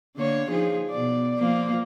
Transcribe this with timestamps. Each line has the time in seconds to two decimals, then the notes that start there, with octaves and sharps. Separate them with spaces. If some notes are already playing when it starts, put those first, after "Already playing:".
0.16 D3 A#3 C#5
0.49 F3 D#4 G#4
0.91 B2 D5
1.39 F3 A#3